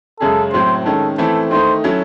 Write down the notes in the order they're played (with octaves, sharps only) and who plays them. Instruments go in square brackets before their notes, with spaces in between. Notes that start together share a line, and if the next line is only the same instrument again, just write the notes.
[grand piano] F#2 C#3 G#3 C#4 G#4 [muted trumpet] A4
[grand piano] A2 F#3 C4 [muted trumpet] C5
[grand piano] D#3 G#3 C#4 [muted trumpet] A4
[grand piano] E3 A3 C4 E4 [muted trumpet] A4
[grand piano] D#3 A3 D#4 [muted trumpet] C5
[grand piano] F#3 C#4 E4 A4